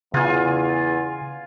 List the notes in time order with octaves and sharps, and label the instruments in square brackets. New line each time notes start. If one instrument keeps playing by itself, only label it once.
[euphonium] E2 [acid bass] C#3 [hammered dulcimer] F4 G#5